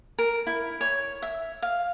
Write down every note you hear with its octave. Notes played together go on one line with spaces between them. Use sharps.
A#4
E4
C#5
E5
F5